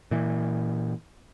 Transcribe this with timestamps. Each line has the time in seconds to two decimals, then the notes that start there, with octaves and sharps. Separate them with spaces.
0.11 A#2 E3